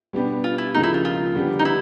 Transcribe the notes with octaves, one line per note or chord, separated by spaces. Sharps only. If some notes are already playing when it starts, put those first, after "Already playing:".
B2 G3 B3 D4 G4
F4
E4
C#2 C#3 F3 A#3 D#4
E4
F4
F4
D3 G3 B3 D4 G4
D#4
E4